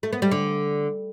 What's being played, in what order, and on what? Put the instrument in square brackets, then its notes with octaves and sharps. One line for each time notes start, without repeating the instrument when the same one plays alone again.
[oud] A3
B3
G3
D3